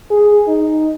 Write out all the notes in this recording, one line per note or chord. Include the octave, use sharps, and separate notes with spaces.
G#4
D#4